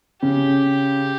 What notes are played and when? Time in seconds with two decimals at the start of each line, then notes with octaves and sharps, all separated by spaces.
0.22 C#3 G4